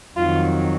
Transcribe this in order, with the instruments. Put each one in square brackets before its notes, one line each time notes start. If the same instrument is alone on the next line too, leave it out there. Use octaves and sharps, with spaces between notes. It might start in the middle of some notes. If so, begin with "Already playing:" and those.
[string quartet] F2 D#3 F#3 F4